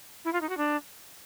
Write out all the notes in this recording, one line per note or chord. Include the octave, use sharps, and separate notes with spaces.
E4
F4
D#4
F#4
D4